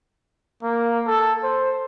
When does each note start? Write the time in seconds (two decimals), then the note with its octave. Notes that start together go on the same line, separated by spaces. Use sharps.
0.63 A#3
1.07 A4
1.43 C5